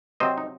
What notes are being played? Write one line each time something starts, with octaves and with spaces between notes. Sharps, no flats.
C3 F#3 C4 C5 D#5
D#4